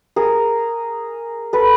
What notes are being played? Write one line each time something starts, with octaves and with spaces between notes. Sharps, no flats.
G#4 A#4
A4 B4